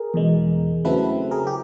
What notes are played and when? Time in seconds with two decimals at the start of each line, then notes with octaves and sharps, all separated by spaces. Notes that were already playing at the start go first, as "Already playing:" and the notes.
Already playing: G#4 A#4
0.14 E2 B2 G#3
0.85 C#3 F#3 A3 C4 E4 A4 B4
1.31 G#4 A#4
1.47 G4